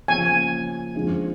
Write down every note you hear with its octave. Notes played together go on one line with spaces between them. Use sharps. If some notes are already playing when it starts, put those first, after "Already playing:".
C#3 F3 A#3 G#5
F2 D3 F3 G#3